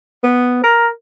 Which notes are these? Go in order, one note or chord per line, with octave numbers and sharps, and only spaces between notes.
B3
A#4